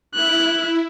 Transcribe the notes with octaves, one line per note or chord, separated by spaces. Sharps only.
E4 F#6